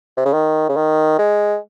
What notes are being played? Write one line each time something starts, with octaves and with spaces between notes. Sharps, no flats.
C3
C#3
D#3
C#3
D#3
G#3